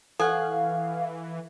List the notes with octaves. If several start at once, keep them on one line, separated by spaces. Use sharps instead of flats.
E3 A4 C#5 F5 F#5 G#5